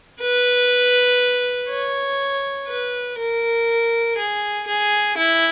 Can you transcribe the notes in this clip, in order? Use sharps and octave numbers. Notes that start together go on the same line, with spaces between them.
B4
C#5
B4
A#4
G#4
G#4
E4